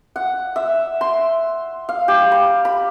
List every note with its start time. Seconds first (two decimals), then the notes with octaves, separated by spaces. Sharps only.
0.16 F#5
0.56 E5
1.01 C6
1.89 F5
2.08 G4
2.32 B5
2.65 B5